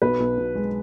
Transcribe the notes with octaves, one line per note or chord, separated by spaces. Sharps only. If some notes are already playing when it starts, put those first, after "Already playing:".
B1 B4
B1
B2
G#3